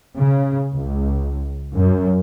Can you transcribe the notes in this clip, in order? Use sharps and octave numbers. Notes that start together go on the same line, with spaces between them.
C#3
C#2
F#2